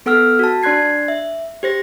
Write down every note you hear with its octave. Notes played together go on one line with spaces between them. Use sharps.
B3 A4 F#5 E6 F6
F#4 A5
D4 D5 C6 F#6 G#6 C7
E5
G4 C5 A#6